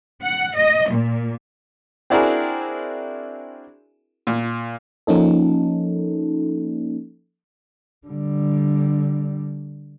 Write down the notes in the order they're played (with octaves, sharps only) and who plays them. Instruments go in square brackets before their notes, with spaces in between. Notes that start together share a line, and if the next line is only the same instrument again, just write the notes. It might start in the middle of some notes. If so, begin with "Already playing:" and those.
[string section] F#5
D#5
A#2
[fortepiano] C4 D4 E4 F#4 G#4 A#4
A#2
[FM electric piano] F3 A#3 C#4 D#4 A4
[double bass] D3 G3